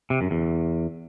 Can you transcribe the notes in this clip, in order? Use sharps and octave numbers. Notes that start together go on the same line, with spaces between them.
C3
F#2
E2